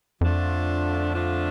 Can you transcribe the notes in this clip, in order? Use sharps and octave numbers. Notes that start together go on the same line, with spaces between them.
F2 D3 F3 A3 D4 F4
D3 F3 A3 D4 F4